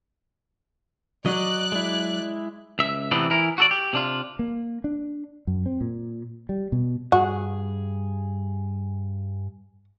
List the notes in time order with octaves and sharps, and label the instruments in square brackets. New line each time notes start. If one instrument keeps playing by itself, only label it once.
[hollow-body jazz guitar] F#3 [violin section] D5 F#6 [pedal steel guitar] D#5
[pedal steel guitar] G#3 E4
[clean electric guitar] C#2 E5
C3 E3 A3 B3 C4 D4
E3 E4 A#4
F#4 A4 D5
G4
C3 D4 F4
[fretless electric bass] A#3
D4
F#2
C4
A#2
G3
B2
[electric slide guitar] G2 G#4 [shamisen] F#4